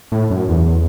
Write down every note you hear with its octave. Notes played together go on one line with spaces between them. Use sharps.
A2
F#2
E2